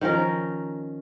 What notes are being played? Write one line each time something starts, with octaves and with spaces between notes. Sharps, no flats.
D#3 F3 C#4 A#4